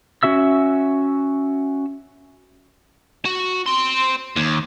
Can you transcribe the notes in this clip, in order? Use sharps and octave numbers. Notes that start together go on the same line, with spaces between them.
C#4 F#4 E5 E6
F#4
C4 C6
D#2